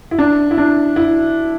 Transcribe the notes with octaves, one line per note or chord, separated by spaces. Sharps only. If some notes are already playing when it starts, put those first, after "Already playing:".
E4
D4
E4
D4
E4